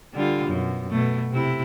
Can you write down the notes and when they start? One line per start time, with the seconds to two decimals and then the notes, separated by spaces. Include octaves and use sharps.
0.14 D3 G3 F4
0.47 F#2 B2
0.90 B2 A3
1.32 C3 E4